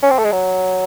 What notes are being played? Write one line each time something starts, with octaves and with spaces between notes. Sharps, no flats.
C#4
C4
A3
G#3
F#3